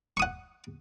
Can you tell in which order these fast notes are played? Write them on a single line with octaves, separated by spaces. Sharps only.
C#6 D#6 F#5